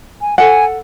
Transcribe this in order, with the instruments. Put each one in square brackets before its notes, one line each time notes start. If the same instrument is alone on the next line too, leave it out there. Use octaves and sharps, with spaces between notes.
[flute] G#5
[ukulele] A4 F#5 [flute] G#5